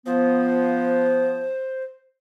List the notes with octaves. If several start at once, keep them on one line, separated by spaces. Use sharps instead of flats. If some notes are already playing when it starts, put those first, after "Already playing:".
F3 B3 C5